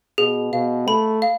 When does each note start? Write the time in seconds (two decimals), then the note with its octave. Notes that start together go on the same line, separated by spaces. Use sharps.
0.18 B2 G#4
0.53 B2 F5
0.87 A3 B5
1.22 F5